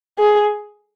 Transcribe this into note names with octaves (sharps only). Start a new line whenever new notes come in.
G#4